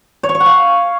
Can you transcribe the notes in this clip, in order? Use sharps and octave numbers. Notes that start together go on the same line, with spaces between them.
C#5
C#6
C#5
F#5
F5